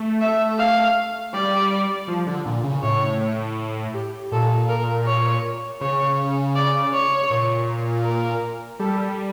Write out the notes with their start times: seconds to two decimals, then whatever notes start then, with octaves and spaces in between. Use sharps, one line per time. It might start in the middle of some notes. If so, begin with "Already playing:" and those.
Already playing: A3
0.21 E5
0.58 F5
1.34 G3 D5
2.08 F3
2.27 D3
2.46 A#2
2.64 C#3
2.83 A2 C#5
3.94 G4
4.32 A#2 A4
4.69 A#4
5.06 C#5
5.81 C#3 C#5
6.56 D5
6.93 C#5
7.30 A#2
8.05 A#4
8.79 G3 A4